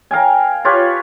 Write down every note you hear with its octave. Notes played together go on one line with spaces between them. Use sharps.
A#4 F5 G5 G#5
F4 G4 B4 C#5